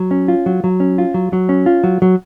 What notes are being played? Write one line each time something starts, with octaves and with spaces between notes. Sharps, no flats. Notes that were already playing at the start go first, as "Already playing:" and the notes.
Already playing: F#3
C#4
F4
F#3
F#3
C#4
F4
F#3
F#3
C#4
F4
F#3
F#3